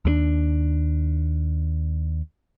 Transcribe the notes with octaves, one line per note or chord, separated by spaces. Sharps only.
D#2 G3 D4